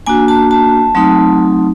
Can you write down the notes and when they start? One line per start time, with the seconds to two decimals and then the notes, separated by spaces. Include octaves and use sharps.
0.06 A#3 D4 F#4 G#5
0.28 A5
0.51 A5
0.95 F#3 A3 C4 D#4